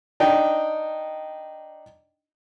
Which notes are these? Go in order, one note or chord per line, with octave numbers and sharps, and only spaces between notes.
D4 D#4 G5